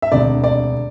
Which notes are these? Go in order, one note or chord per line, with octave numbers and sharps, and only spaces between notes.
E5
E1 D2 C3 D5
D5